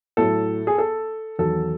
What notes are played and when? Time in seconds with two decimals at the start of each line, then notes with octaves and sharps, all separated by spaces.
0.17 A2 F#3 A4
0.67 G#4
0.78 A4
1.39 E2 D#3 F#3 A4